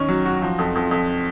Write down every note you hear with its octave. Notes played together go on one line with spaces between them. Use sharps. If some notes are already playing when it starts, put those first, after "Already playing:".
Already playing: D#3 C#4
F#3
F#4
F3
F2
F2
F2